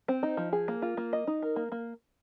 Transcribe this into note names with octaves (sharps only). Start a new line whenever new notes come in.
C4
D#4
F3
G#4
A#3
F4
A#3
D#5
D#4
A#4
A#3
A#3